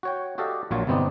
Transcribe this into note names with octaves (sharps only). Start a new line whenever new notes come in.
F#4 C#5 G5
F#4 G4 A4 D5 D#5 F5
A#1 A#2 F#3 F4 C#5
G1 C3 B3 C4 D#4 D5